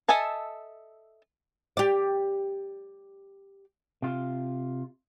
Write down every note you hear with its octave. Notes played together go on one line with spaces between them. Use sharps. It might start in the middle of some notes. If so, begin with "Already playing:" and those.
A4 D#5 E5 G#5 A5
G4 D5
C3 F4